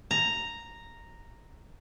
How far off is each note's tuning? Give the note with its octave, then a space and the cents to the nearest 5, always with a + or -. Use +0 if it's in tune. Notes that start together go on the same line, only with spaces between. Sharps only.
A#5 -5